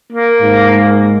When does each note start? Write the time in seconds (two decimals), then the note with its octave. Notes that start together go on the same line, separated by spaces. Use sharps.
0.12 A#3
0.42 G#2